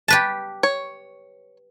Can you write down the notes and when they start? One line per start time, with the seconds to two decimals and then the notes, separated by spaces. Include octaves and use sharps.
0.08 G4 B4 A5
0.63 C#5